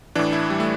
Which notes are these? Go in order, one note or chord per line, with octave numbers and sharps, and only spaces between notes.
A2 E3 D4
E4
G3
A3